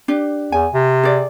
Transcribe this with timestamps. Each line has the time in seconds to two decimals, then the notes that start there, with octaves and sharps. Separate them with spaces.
0.08 D4 G4
0.52 E2 G#5
0.74 C3
1.03 G#4 D5